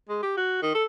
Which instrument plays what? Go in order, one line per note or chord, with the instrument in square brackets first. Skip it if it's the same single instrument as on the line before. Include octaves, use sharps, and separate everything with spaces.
[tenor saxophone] G#3
G4
F#4
D#3
A4